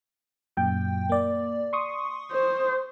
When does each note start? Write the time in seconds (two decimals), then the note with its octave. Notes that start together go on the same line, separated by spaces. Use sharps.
0.57 F#2 A#2 G5
1.09 A#3 D5
1.73 C6 C#6 D#6
2.32 C5